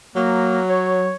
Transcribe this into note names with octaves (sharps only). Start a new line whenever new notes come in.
F#3 A#3
C#5